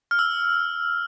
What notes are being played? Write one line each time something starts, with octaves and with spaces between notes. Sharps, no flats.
F6
E6